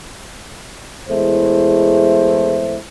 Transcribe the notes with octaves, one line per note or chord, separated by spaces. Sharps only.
E2 G#3 A3 E4 C5